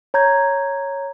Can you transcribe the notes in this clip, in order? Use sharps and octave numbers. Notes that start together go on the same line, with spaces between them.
C#5 A#5 G6 G#6